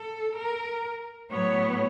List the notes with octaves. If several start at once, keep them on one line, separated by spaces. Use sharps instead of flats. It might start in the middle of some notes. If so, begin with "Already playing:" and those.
Already playing: A4
A#4
A2 F#3 B3 C#5